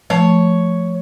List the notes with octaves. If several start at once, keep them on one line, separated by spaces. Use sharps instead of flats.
F3 A3 C#5